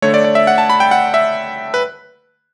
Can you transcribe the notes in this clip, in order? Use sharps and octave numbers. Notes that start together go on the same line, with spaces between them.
D3 A3 C#5
D5
D5
E5
F#5
A5
B5
G5
F#5
E5
B4